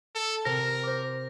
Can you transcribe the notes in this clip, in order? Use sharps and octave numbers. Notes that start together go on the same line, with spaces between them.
A4
C3 A#4 A#6
C5 D6